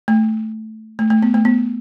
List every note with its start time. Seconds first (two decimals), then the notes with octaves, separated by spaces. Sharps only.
0.08 A3
0.99 A3
1.10 A3
1.22 B3
1.34 A3
1.45 B3